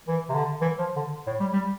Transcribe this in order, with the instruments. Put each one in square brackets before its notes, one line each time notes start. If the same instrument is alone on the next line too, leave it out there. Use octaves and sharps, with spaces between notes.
[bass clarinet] E3
C3
D3
E3
F3
D3
A2
G3
G3